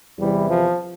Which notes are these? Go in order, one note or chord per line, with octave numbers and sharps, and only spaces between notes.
E2 C3 E3 G3
F3